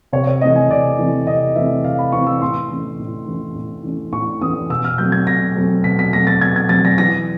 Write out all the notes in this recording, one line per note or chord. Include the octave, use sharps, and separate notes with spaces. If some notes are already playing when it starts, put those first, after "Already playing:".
C3 C#5
C#5
E3 A3 C4 D#5
G#5
C3 D5
E3 A3 C4
C3 D#5
E3 A3 C4 E5
C3 F5
B5
E3 A3 C4 C#6
E6
A2 C6
E3 A3 C#4
A2
E3 A3 C#4
A2
E3 A3 C#4
A2 C#6
E3 A3 C#4 D#6
B2 E6
F6
F#3 A3 C4 G6
G#6
B2 A#6
F#3 A3 C4
B2 B6
B6
F#3 A3 C4 A#6
A6
B2 G#6
G#6
F#3 A3 C4 A6
A#6
E3 A#6